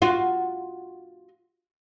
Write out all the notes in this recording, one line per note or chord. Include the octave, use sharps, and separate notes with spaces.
F4 F#4